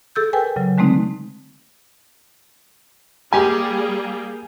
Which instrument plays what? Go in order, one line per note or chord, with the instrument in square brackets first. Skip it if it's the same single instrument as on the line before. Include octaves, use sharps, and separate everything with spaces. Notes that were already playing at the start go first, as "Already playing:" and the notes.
[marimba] G#4 A4 E6 G6
A#4 B4 G5 G#5
C#3 F#3
D3 G#3 A3 C4 D#4
[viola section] G3 A#3 G#4 [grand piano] G4 G#5